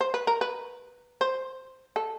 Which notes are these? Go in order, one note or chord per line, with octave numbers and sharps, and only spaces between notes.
C5
B4
A#4
B4
C5
A4